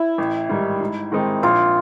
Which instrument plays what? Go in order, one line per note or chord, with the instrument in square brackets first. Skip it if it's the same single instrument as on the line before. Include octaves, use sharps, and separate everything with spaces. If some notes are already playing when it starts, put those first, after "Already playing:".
Already playing: [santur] E4
[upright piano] A1
G#2 D#3 G3
G#2
D#3 G#3 C4 D#4
[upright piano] A#1 [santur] F4